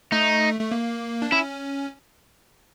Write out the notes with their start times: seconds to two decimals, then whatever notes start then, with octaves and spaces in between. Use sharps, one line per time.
0.12 A3 D#4
0.60 A3
0.71 A#3
1.22 D4
1.32 C#4 E4